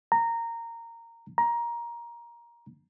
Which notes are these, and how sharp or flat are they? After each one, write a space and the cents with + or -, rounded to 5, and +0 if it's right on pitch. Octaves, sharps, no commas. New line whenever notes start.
A#5 -15
A#5 +15